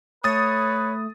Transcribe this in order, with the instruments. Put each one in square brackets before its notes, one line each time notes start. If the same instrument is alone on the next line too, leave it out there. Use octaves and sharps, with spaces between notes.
[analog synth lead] A3 [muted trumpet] B4 [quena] C#5 [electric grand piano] D#6 A6